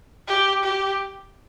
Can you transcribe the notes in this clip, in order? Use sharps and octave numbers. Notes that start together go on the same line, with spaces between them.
G4
G4